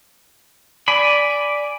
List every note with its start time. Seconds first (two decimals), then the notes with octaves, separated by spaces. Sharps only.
0.88 D5 G#5 B5